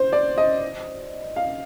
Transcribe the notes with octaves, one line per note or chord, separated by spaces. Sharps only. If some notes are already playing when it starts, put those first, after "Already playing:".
Already playing: C5
D5
D#5
F5